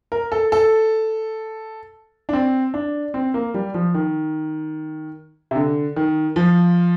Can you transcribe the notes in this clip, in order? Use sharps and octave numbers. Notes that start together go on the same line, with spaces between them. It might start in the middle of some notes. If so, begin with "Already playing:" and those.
A#4
A4
A4
D4
C4
D4
C4
A#3
G3
F3
D#3
C3
D3
D#3
F3